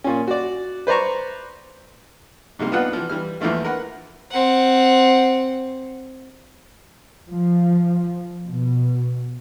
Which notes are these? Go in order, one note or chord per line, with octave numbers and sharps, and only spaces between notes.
A#2 C#4
F#4 D5
B4 C5 D5 A#5 C#6
G#2 C3 G3 A#3
B3 D4 D#4 F4 B4 F#5
E3 F3
E3 G3 F6
E2 E3 F3 A3 A#3
A#4 B4 F#5
C4 F#5
F3
B2